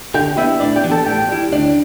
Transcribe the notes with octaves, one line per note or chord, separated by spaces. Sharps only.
D3 G4 G5
B3 D4 E4 E5
A2 D4 D5
G4 G5
E3 B3 D4
A4 A5
A2 G4 G5
G3 E4
D2 D4 D5